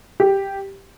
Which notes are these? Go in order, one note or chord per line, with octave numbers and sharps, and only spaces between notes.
G4